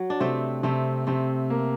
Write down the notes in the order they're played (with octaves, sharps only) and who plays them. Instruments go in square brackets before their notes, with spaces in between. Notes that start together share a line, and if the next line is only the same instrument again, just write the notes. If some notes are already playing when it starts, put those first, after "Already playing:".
Already playing: [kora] F#3
D4
[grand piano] C3 [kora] A3 C4
[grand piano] C3 [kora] A3 C4
[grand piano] C3 [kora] A3 C4
[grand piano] A#3